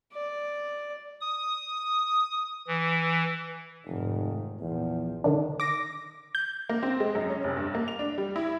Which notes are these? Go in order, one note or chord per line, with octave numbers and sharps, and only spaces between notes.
D5
D#6
E3
F1 G#2 D#3
A#1 E2 A#2 F3
D3 D#3 D4
D6 A#6
G6
A#3
C4
G#3
F#2
C#4
F1
G2
A#3
F7
D4
G3
E4